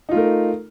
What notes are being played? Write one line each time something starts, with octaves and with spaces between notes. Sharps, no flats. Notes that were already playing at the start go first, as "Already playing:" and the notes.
A3 D#4 F4 A#4